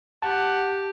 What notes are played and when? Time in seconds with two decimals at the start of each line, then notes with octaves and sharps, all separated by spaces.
0.22 G4 F#5 A5